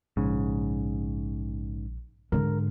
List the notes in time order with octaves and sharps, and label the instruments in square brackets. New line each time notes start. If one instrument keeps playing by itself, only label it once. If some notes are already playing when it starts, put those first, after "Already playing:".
[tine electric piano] A#1 [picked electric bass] G#2 C#3
[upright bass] G#2 D3 [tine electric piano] A#4